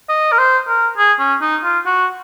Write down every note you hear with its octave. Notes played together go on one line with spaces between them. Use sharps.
D#5
A#4
C5
A#4
G#4
C#4
D#4
F4
F#4